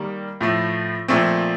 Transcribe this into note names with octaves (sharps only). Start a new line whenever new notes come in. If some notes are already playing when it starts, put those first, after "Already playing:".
Already playing: D#3 G3 A#3
A2 F3 A3
A#2 F3 A3 C4